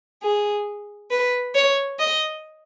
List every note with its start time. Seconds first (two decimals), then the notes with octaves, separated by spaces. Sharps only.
0.23 G#4
1.11 B4
1.55 C#5
1.99 D#5